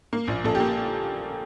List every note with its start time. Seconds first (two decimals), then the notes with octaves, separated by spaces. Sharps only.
0.13 A#3
0.28 A#1
0.44 A#1 A4
0.55 G4
0.60 A#3